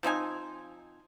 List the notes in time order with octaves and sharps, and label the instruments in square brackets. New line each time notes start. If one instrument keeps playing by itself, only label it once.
[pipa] F3 C4 D#4 G#5